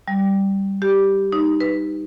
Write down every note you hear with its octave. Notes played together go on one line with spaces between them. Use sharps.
G3
G4
D#4
B4